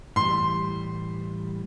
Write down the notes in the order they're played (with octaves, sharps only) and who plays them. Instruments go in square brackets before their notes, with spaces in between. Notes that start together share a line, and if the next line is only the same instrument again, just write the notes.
[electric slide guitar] A2 E3 G3 [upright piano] C6